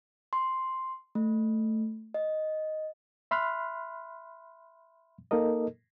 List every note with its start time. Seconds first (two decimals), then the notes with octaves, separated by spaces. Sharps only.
0.33 C6
1.15 A3
2.14 D#5
3.31 E5 B5 C6 F6 F#6
5.31 A#3 D#4 A4 A#4 D#5